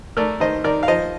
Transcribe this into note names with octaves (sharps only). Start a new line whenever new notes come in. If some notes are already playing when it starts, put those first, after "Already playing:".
A3 A#4 D5
D#3 C5 D#5
D#3 A#4 D5
F5
F3 C5 D#5